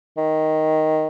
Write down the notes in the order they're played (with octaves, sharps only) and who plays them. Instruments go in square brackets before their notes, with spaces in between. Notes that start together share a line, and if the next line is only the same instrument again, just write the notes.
[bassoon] D#3